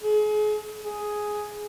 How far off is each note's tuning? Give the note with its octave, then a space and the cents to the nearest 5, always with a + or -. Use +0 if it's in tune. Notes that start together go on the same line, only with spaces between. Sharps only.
G#4 +35
G#4 +5